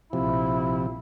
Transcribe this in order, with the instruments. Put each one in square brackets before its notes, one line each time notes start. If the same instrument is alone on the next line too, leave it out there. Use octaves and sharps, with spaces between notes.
[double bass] A#1 E4 [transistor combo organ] C3 F3